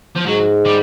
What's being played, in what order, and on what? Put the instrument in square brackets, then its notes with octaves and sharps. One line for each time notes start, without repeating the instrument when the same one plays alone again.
[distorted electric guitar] F3
[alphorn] G#2 [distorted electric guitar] F#3
[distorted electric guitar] G3